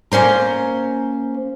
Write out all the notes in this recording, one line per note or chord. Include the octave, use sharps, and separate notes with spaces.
A#3 C#4 C5 A#5